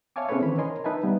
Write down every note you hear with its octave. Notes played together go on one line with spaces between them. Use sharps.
C#5 E5 F5 G#5 A5 D6
C4 C#4 G#4 A4 B4 C#5
D#3 E3 C5 B5
A#4 C#5 D#5 G#5 C6
D#4 B4 E5 G#5 A5
G3 B3